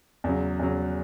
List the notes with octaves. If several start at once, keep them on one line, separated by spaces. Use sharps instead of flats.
E2 C#3 F#3
E2 C#3 F#3